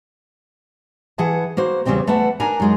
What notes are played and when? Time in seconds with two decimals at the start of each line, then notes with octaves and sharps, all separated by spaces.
1.18 E3 G#4 F#5 A5
1.57 A#3 F#4 C5
1.85 E2 C#3 G3 G#3 C4 G5
2.07 E2 A3 B4 F#5 A5
2.40 D4 A#4 G#5 A#5
2.60 F#2 G#3 D#4